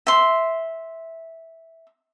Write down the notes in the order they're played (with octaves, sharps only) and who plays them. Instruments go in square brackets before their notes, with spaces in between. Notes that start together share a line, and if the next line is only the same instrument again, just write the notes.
[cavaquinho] E5 C6